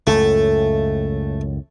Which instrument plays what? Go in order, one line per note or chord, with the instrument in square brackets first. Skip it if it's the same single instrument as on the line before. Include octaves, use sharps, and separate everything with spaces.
[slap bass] C#2 F#2 A2 [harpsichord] A3